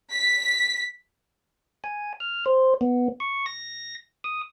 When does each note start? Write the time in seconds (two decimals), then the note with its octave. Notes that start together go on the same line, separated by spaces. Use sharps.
0.13 B6
1.84 G#5
2.20 F6
2.46 C5
2.81 B3
3.20 C#6
3.46 A#6
4.24 D#6